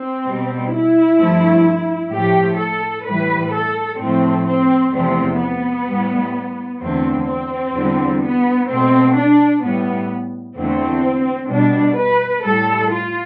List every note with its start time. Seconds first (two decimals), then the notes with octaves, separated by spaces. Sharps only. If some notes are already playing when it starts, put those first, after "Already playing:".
Already playing: C4
0.25 B2 G3
0.72 E4
1.18 G2 F3 A3
2.12 A2 F3 A3 G4
2.59 A4
3.05 A2 E3 G3 B4
3.53 A4
3.99 A2 F3 A3 C4
4.46 C4
4.93 E2 C3 F3 A3 C4
5.40 B3
5.88 A2 G3
6.81 E2 D3 A3 C4
7.28 C4
7.75 E2 D3 G3
8.22 B3
8.68 B2 A3 C4
9.16 D4
9.62 A2 G3 B3
10.56 E2 D3 A3 C4
11.50 B2 G3 D4
11.97 B4
12.43 A2 G3 A4
12.91 F4